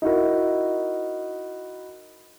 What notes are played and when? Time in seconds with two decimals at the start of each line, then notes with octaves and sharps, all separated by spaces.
0.02 D#4 E4 F#4 A#4